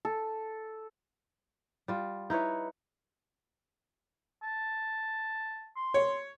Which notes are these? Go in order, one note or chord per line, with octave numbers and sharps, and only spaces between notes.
A4
G3 F4
D#4 E4 B4 C#5
A5
C6
C#5